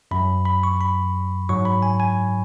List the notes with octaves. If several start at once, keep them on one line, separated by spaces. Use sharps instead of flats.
F#2 F#3 B5
B5
C#6
B5
G#2 F#3 C#6
B5
G#5
G#5